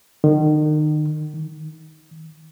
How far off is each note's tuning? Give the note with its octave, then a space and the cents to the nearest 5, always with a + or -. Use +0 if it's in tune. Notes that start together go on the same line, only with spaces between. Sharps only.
D#3 -35
D#3 +30